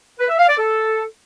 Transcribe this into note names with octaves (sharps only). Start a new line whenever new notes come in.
B4
E5
F5
D5
A4